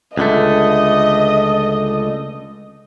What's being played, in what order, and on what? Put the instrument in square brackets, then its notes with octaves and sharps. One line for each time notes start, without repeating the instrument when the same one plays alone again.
[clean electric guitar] C#2 D3 A3 [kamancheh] D#5